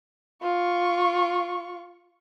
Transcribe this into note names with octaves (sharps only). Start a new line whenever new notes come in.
F4 C#6